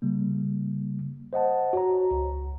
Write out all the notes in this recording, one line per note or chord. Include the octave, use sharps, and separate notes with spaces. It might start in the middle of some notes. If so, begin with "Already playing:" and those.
C#3 G3 A#3
C5 D#5 F#5 A5
F#4 C#5 A#5
C#2